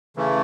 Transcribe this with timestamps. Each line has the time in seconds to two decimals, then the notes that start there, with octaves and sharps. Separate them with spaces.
0.16 C#3 E3 A3